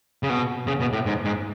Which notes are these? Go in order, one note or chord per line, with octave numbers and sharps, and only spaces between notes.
C#3
B2
C#3
B2
A2
G#2
G#2